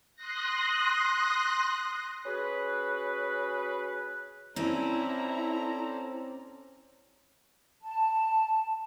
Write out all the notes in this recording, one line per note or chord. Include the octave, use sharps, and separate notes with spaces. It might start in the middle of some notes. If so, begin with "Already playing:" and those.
C6 D#6 F#6 A#6
C#4 F#4 G#4 B4
C4 C#4 E4 A4 C5 D5 A#5
A5